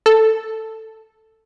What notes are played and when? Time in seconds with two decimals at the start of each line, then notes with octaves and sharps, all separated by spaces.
0.06 A4